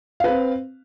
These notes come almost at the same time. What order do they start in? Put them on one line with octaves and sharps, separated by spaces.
F5 B4 C4